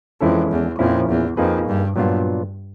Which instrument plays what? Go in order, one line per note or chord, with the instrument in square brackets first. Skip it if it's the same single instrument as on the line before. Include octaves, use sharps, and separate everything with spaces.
[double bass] F2 [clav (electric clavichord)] E3 G#3 C#4 E4 A4
[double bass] E2
[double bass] F2 [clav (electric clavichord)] A#2 F3 A#3 C#4 E4
[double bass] E2
[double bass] F2 [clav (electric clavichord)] A#3 D#4 G#4 B4
[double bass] G2
[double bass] G2 [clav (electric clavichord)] A#2 F#3 B3 D4 F4